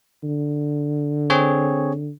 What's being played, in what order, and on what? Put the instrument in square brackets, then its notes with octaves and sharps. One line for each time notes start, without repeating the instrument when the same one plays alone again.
[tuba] D3
[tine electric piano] C4 G#4 C#5